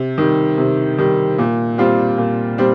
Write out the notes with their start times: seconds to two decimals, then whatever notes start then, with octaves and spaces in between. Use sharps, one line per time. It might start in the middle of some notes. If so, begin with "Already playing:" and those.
Already playing: C3
0.18 D#3 G3
0.58 C3
0.98 D#3 G3
1.38 A#2
1.78 G3 C4 F4
2.18 A#2
2.58 G3 C4